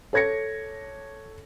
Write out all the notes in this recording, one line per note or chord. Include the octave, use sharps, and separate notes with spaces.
A4 C#5 G#6 A#6 C#7